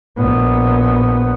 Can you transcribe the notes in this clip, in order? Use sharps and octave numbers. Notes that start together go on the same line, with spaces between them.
A#1 B3